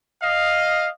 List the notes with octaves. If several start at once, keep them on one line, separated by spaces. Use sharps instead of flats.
D#5 F5